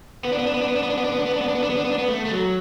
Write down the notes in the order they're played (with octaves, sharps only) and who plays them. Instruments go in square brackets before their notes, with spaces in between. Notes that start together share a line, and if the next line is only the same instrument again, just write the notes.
[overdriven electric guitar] B3
D4
B3
D4
B3
D4
B3
D4
B3
D4
B3
D4
B3
D4
B3
D4
B3
D4
B3
D4
B3
D4
B3
D4
B3
A3
A3
F#3